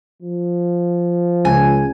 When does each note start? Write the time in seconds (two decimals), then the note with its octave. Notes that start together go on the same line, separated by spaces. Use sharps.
0.22 F3
1.45 C#2 G#5